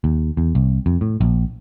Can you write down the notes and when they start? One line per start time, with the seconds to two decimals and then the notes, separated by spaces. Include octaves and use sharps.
0.04 D#2
0.37 E2
0.55 C2
0.86 F2
1.01 A2
1.21 A#1